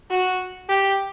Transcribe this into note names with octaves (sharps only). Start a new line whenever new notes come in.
F#4
G4